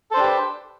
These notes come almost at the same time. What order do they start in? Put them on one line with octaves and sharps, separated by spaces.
A4 C5 D4 G4 B4